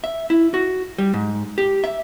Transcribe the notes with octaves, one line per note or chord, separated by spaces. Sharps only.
E5
E4
F#4
G3
G#2
G4
E5